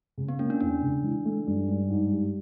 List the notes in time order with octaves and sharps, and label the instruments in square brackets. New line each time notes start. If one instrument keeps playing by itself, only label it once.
[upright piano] C#3
[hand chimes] B3
[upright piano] A#3 [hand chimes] C#4
[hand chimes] D4
[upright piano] E2 [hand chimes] D4
[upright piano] C#3
E3
A3
G2
G2
G#2
G3